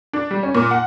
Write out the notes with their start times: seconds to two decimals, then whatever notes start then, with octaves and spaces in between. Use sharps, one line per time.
0.13 D4
0.31 G3
0.43 C#4
0.55 A#2
0.71 F#5